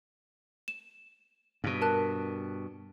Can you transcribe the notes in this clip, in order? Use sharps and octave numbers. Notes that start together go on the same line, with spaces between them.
E7
G2 B2
A#4 A5 F#6